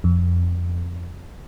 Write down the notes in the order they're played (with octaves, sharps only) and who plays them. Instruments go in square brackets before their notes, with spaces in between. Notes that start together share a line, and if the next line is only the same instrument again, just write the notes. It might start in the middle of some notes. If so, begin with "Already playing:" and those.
[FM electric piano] F2